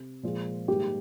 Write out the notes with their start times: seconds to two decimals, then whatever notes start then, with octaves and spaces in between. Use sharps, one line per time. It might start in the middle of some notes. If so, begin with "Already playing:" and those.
Already playing: C3
0.23 A#2 F3 G#3
0.68 G#2 D#3 G3 A#3 G4